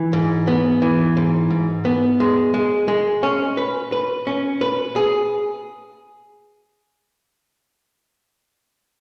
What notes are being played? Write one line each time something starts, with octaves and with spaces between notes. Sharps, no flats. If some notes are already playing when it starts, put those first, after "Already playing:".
Already playing: E3
G#2
B3
E3
G#2
G#2
B3
G#3
G#3
G#3
C#4
B4
B4
C#4
B4
G#4